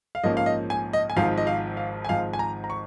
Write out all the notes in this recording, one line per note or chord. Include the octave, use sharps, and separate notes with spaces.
F5
A#1 G#2 F3 A#3 C#4 D#5
F5
D#5
G#5
D#5
G#5
G#1 G#2 F3 F5
D#5
F5
F5
G#5
G#1 G#2 F3 F5
G#5
A#5
A#5
C#6